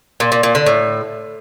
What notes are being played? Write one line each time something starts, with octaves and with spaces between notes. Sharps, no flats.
A#2
A#2
A#2
D3
A2